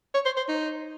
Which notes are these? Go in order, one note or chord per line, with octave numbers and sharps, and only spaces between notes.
C#5
C5
C5
D#4